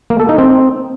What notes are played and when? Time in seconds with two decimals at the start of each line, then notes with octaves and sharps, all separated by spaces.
0.10 A#3
0.20 A4
0.29 D#4
0.38 C4